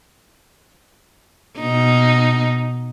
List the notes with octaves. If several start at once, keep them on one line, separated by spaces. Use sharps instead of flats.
B2 D#4